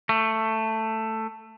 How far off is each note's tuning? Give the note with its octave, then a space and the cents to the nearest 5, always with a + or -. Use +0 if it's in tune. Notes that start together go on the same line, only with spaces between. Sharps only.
A3 +10